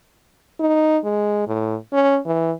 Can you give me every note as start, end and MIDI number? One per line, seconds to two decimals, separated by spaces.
0.60 0.98 63
1.04 1.45 56
1.47 1.75 45
1.92 2.18 61
2.26 2.52 52